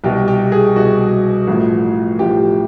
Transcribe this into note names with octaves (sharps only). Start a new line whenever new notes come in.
C2 B2 G4
G4
G#4
C2 B2 F#4
A1 A2 F3
A1 A2 F3 G4